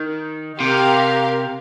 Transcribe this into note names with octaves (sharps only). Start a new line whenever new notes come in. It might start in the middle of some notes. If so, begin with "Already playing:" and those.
Already playing: D#3
C3 G4 A#4 F5